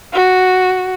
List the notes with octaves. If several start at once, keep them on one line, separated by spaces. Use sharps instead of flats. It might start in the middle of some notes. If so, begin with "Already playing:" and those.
F#4